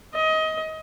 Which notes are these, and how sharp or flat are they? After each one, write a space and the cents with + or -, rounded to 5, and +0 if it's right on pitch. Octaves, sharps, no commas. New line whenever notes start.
D#5 +25